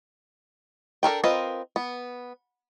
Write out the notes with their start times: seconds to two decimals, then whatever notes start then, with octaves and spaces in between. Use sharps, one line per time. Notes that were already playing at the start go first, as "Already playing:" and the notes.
1.03 D4 A4 A#4 G5
1.24 C4 F4 A#4 B4 D#5
1.76 B3